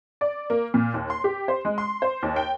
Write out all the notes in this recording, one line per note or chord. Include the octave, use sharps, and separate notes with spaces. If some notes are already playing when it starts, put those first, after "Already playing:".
D5
A#3
A#2
D#2
C6
G4
C5
G#3
C6
C5
D#2
G5